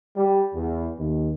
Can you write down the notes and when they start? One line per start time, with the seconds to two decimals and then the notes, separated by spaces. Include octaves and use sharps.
0.16 G3
0.55 E2
0.99 D#2